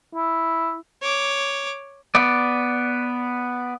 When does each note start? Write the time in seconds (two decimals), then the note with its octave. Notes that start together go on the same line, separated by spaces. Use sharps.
0.15 E4
1.02 C#5 D6
2.15 B3 D5